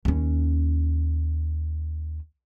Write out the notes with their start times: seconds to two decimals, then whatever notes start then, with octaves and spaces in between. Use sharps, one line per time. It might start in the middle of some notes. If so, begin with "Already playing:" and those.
0.05 D#2 C#4